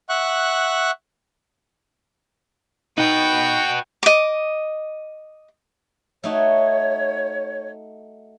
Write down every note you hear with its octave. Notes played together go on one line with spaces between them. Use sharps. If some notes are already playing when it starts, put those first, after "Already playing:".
E5 F#5 C#6 F#6
D#4 F#4 B4 G5
D#5 D6
A3 D#4 F#4 C#5